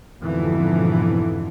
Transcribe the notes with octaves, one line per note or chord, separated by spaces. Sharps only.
F2 G#2 B2 D3 E3